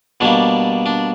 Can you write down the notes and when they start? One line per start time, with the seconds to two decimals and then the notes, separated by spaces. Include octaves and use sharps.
0.20 B2 G3 A#3 D4
0.86 D4